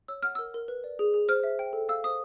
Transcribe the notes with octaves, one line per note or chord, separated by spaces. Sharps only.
C#5 E6
F#5 F6
A#4 E6
A#4
B4
D5
G#4
G#4
C5 F6
E5
G5
A4
F5 E6
C5 D#6